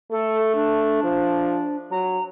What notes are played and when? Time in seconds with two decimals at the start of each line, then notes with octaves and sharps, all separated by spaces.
0.11 A3 A4
0.55 D4
1.04 F3
1.91 F#3 A#5